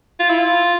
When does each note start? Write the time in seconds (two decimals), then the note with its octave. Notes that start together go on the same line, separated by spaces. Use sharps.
0.20 F4
0.29 E4
0.39 F4